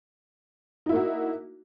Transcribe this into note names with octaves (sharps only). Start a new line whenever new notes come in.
A#3 D#4 E4 F#4